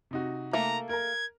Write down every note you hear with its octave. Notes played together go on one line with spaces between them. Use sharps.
C3 D#4 F#4
A3 A#3 A#5
A#4 A#5 G#6